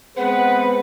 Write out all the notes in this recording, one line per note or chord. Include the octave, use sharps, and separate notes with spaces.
G#3 B3 C4 B4 F#5